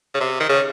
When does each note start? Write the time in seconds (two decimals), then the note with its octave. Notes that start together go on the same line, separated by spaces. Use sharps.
0.14 C#3
0.20 C3
0.40 D#3
0.49 C#3